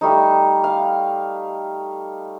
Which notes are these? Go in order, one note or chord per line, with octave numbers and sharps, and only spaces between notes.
G3 A3 D#4
F5